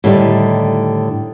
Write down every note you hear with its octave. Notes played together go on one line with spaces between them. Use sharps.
A2 D3 D#3 G3